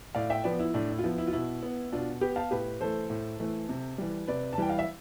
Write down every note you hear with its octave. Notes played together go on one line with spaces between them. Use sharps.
A2 D5 F5
E5 G5
F3 B3 B4 D5
E4
A2 D4
E4
F4
F3 B3 E4
E4
F4
B2 E4
B3
B2 D4 F4
B3 G4 B4
F5 A5
A2 G4 B4
E3 A3 A4 C5
A2
E3 A3
C3
E3 G3
C3 B4 D5
A5
E3 G3 G5
F5
E5